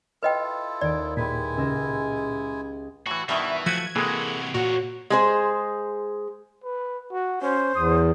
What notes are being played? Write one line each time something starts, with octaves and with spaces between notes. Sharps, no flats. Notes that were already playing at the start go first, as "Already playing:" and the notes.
E4 F4 A4 B4 D#5 G5
D#2 D5 D7
A#2 G#3 E4 G4 B4 G#5 B6
C#2 E6 A#6
A2 E3 F#4
G2 B2 D#3 E3 E5
F3 A3 F#4 B4 G#6
C3 E3 G#3 A#3 F#4 G#4 A4
A#2 F#4 A#4 C#5
G#3 G#4 C5
B4
F#4
C#4 C5
E2 D#6